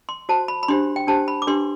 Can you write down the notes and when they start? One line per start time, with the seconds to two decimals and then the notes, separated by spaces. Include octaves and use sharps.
0.09 C6
0.29 F#4 C5 A5
0.48 B5
0.63 B5
0.68 D4 G4 C5 C6
0.96 G5
1.07 D4 G4 C5 A5
1.28 B5
1.42 D6
1.47 D4 G4 B4 C6